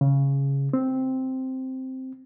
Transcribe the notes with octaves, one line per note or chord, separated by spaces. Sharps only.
C#3
C4